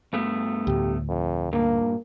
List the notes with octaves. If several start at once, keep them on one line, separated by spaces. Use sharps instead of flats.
G2 A3 B3
D2 A2 G4
F2
G2 A#2 A#3